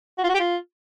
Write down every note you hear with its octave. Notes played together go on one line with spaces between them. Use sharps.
F#4
F4
F#4
G4
F4